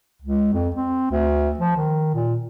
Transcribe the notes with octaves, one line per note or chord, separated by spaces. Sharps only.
C#2
F2
C4
D2
F3
D#3
A#2